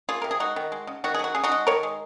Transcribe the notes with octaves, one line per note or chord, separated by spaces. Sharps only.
A#3 F4 G#4
C3 A#4
G#4
G#3 D#4 F#4
D#3
G#3
C#3
D#3 F#4
G#4
F#3 F#4
C#3 G#4
D#4 F#4
G#3
D#3 A#4 C#5
G#3